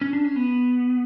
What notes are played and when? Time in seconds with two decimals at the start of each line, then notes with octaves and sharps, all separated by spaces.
0.01 C#4
0.13 D4
0.24 C#4
0.36 B3